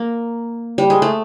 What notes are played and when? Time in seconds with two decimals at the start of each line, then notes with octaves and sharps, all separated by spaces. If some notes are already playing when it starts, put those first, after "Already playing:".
Already playing: A#3
0.78 G3
0.90 G#3
1.02 A3